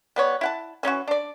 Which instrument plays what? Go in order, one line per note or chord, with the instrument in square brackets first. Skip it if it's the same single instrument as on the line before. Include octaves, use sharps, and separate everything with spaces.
[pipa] G3 B3 C#5
E4 F#5 A5
E3 C#4 D#4 F#4
D4 D5